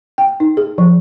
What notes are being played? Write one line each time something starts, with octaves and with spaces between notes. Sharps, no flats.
G5
D#4
G#4
F3